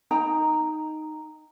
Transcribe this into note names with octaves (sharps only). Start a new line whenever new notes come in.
D#4 D#5 G5 A#5